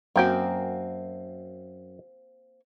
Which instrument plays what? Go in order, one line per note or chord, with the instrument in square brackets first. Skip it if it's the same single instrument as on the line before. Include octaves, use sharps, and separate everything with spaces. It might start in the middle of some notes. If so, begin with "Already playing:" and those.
[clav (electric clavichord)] F#2 G5 [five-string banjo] A#3 C4 F#4